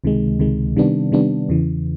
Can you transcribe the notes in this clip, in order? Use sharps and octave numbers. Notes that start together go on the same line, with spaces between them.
C#2 C3 D#3 G#3
C#2 C3 D#3 G#3
C3 D#3 G3 B3 D4
C3 D#3 G3 B3 D4
E2 C#3 E3